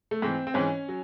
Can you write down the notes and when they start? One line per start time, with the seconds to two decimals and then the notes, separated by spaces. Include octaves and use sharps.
0.11 A3
0.22 G#2 E3 C4
0.47 C4
0.54 G#2 E3 C#4
0.88 F#3